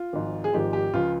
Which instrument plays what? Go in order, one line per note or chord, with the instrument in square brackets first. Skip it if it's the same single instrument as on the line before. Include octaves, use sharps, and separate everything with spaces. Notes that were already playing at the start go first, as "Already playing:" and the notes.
Already playing: [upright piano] F4
G#1 G#2 F3
G#4
G#1 G#2 F3 G4
G4
C#2 C#3 F3 F4